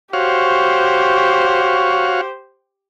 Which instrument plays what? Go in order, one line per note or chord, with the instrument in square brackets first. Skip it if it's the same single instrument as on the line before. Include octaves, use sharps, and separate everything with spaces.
[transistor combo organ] F#4 C#5 F5 [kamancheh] G4 C5